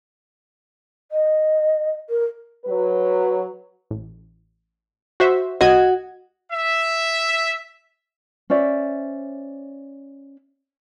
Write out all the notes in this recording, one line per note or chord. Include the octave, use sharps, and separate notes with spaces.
D#5
A#4
F#3 B4
A1
F#4 C5 E5
C2 F#4 D#5 G#6
E5
C#4 C5 D5 E5